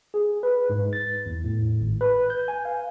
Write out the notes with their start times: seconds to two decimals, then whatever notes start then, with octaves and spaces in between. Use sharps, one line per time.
0.14 G#4
0.43 B4
0.69 G#2
0.93 A6
1.26 E2
1.44 A2
1.80 G#1
2.01 B4
2.30 G6
2.48 G#5
2.65 F5